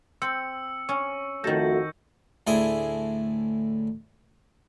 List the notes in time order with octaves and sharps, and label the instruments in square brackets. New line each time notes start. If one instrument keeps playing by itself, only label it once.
[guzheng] C4 [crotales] E6 C#7
[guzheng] C#4 [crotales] C#6
[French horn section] F2 A3 F#4 [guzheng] D#3 A4 [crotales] G6 A#6
[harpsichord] D2 A2 E4 G#4 C5